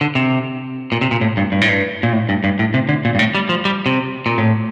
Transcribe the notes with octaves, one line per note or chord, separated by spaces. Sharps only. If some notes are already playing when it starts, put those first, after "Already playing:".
D3
C3
A#2
C3
A#2
A2
G2
G2
A2
G2
A#2
A2
G2
G2
A2
C3
D3
A#2
G2
A2
G3
F3
G3
C3
A#2
A2